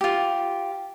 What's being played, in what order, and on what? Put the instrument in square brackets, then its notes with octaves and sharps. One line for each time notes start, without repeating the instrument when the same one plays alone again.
[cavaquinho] F4 G4